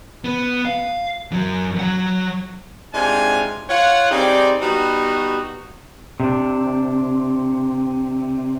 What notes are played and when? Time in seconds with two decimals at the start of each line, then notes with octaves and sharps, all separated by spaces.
0.24 B3
0.65 F5
1.32 F#2 F#3
1.80 F#3 F#5
2.94 G#2 C3 D4 D#4 F4 G#5
3.70 F4 C#5 F#5
4.12 G3 C4 D#4 G#4 D5
4.62 G3 B3 D#4 F#4
6.20 C3 D4